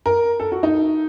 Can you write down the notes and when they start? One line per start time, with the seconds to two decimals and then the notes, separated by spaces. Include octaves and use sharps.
0.06 A#4
0.40 A4
0.52 F#4
0.63 D#4